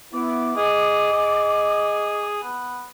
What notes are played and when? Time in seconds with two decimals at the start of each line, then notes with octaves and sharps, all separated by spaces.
0.13 B3 E4 D6
0.57 G#4 D#5
1.13 G#4
2.43 B3